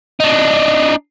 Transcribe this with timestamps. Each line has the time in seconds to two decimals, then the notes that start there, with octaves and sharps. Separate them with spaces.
0.20 D4 D#4